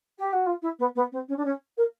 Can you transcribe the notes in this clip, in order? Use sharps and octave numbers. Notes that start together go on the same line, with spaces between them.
G4
F#4
F4
E4
B3
B3
C4
C#4
D4
C#4
A#4